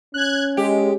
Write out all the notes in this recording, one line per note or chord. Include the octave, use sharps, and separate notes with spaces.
C#4 F#6 G#6
G#3 G4